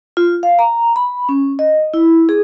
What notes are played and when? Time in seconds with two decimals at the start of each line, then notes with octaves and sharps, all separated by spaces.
0.17 F4
0.43 F5
0.59 A#5
0.96 B5
1.29 C#4
1.59 D#5
1.94 E4
2.29 G#4